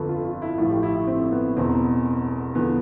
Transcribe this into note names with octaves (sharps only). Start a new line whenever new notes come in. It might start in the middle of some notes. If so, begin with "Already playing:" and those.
Already playing: G1 F2 D3 F3 A4 B4
F4
F4
E4
A1 A2 F3 F4
G4
E4
E4
C4
B3
E1 E2 B2 C4
E2 D3 F3 B3